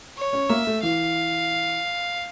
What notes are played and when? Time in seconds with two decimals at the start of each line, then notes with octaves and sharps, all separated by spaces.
0.17 C#5
0.33 C#4
0.50 A#3 E5
0.67 A3
0.82 E3 F5